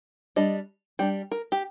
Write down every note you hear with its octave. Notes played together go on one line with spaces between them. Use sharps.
G3 D4 D#5
G3 D4 G5
A#4
G4